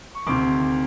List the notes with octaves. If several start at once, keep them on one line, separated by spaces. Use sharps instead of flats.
C#6
D2 C3 D#3 C6 D6